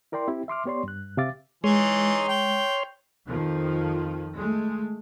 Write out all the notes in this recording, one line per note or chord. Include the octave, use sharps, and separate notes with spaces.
E4 A#4 D5 G5 C6
C4 E4 G4
E5 C6 D6 F6
B3 G4 C#5 D5 C6
G2 F#6
C3 G4 E5 F5 D6 A6
E3 G#3 D#4 C#5 C6 F6
G5
F2 D#3 F3
G#3 A3